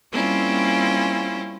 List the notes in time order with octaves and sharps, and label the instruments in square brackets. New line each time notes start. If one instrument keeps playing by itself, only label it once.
[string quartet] G3 A#3 C4 C#4 E4 F4